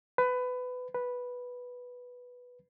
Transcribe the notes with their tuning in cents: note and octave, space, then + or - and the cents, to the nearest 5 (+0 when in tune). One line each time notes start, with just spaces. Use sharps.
B4 +20
B4 -5